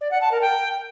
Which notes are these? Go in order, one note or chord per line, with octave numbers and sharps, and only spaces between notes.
D5
F#5
A5
A#4
G5